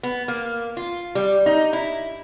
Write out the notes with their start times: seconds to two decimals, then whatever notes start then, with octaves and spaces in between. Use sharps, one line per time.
0.03 B3
0.28 A#3
0.77 F4
1.15 G3
1.46 D#4
1.73 E4